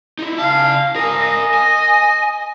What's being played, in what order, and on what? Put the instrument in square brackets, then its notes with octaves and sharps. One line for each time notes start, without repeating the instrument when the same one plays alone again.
[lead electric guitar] D#4 E4
[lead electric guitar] C#3 A5 [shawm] F5
[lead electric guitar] A#4 G#5 [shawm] D#5
[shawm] D#5
[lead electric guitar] G#5